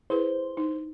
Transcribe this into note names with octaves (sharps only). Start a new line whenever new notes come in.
E4 G#4 B4 C5
D#4